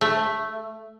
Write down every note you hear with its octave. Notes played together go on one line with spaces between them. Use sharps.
A3